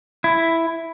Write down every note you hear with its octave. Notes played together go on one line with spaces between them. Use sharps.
E4